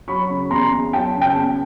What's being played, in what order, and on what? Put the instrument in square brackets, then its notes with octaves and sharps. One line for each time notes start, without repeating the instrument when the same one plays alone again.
[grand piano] F#3 B5 C#6
C#3
E2 A#5 C6
E2
F#3 G5 A5
C#3
G5 A5
E2